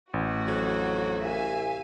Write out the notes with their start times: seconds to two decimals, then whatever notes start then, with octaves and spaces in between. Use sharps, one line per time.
0.14 A1 F#4
0.47 F2 F#3
1.23 C2 E5 F5 G#5